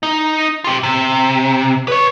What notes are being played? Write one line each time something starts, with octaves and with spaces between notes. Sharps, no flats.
D#4
F4 G4
C3
B4 C#5